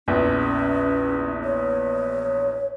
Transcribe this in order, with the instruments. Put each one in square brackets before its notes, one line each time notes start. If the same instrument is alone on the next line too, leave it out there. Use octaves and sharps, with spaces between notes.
[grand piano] A#1 E2 [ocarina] C#4
[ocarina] C#5